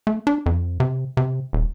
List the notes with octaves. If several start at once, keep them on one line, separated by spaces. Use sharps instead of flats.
A3
D4
F2
C3
C3
D#1